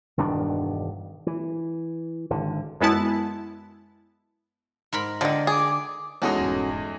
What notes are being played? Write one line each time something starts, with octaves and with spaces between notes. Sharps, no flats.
E1 G2 D#3 D4
E3
G#1 D3
F#2 G#3 B3 E4 A5
G#2 A#4 B5
D3 D#3 F3 D5
G#4 D6
E2 G#3 C#4 D#4 F#4 A4
D#1 G2